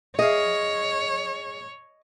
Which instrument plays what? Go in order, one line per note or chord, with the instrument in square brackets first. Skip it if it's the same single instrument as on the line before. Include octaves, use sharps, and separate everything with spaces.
[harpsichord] G#4 F5 [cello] C#5 [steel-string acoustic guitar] D#5